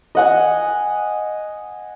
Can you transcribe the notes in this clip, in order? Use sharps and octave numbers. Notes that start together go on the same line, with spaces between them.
D#5 F#5 G#5